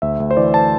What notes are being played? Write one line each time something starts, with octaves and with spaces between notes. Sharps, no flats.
D2 E5
D2
C5
E3 D5
A5